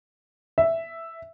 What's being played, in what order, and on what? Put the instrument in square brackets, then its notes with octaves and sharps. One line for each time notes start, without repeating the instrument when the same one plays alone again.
[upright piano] E5